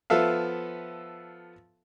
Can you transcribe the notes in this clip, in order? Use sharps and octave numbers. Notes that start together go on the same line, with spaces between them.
F3 B3 A4 E5 F5